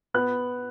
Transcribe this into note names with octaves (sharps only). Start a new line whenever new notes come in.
B3 F#6